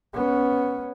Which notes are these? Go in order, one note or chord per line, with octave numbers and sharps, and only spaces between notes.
B3 C#4